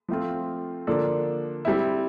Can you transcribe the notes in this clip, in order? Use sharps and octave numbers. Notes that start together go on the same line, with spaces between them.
F3 A3 C4 F4
D3 F3 A#3 D4 A4
G3 C4 E4